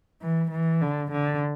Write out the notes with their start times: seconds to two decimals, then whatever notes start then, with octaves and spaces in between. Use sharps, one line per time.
0.22 E3
0.51 E3
0.81 D3
1.12 D3